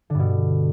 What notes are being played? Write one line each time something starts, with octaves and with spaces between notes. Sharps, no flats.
G2 B2 D3